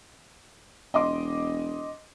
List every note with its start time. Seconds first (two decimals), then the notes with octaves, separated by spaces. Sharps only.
0.94 E1 D#5 C6 D6